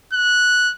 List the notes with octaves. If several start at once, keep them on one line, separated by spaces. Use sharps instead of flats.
F#6